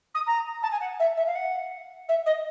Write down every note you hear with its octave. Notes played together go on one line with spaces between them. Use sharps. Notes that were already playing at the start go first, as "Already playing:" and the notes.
D#6
A#5
A5
G#5
F#5
E5
E5
F5
F#5
E5
D#5